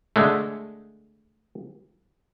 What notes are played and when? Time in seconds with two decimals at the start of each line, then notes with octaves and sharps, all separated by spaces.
0.16 D3 G#3 A3